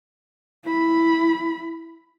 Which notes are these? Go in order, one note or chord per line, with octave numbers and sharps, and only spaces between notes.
E4 B5